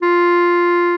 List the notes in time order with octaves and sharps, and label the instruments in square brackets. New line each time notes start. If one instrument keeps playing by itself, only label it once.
[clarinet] F4